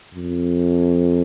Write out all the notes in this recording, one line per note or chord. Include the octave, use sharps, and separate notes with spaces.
F2